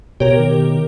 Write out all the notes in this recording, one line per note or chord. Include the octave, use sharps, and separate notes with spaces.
B2 G4 A#4 C#5
D#3